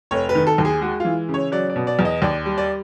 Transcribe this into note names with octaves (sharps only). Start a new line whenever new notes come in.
F1 C#5
B4
D#3
A4
D#2
G#4
G#3 F#4
E3 F4
C#3
C#5
F#3 D5
D5
B2
D5
E2
D#5
D#2 D5
G3
D5